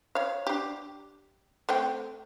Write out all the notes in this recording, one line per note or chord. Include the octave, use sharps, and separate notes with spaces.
C#5 F5
D4 G4
A3 C4 G5